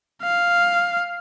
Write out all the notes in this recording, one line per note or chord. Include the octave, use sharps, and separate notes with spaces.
F5